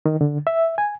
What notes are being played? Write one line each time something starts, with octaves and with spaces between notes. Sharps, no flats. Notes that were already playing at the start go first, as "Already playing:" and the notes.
D#3
D3
E5
G#5